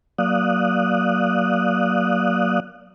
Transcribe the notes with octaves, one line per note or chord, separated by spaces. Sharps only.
F#3 A#3 D5 F5 D#6 F#6